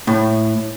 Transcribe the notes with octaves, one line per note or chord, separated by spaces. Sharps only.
A2